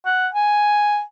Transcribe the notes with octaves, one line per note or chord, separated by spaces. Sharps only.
F#5
G#5